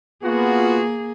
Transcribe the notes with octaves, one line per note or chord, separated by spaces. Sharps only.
A#3 B3 F4 F#4 G#4